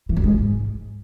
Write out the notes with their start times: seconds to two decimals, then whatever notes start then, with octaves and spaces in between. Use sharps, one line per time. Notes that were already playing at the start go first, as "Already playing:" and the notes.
0.09 E3
0.16 F#2
0.24 G#3
0.31 G#2